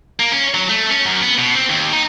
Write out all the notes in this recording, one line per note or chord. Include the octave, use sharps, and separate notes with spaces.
A#3
C#4
F#3
A3
C#4
F#2
B3
B2
C4
D#2
D#4